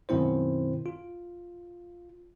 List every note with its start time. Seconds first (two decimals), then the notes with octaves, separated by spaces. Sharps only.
0.09 F#2 B2 D#3 C4 E4 C5
0.86 F4